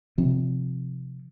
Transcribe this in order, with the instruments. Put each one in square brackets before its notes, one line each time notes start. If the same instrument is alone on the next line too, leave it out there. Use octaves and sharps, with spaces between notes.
[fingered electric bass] C3 F3 C4